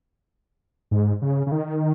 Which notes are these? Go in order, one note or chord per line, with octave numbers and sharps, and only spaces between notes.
G#2
C#3
C#3
D#3